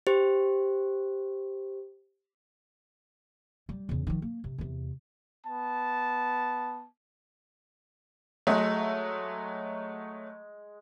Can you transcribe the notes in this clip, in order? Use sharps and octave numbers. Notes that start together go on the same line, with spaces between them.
G4 C5
G3
E2 C#3
D#3 F3
A#3
C3
E2 C3
B3 A5
F#3 G#3 A3 E5